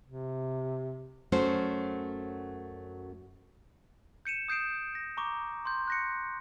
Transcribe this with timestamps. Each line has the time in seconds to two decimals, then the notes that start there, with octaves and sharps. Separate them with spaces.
0.05 C3
1.32 F#2 F#3 A3 C#4 C5
4.25 G6 C#7 D#7 E7
4.48 D#6 G6 C7 D7 E7
4.95 A#6
5.17 A#5 C#6 D6
5.65 C6 G6
5.88 F#6 A#6 C#7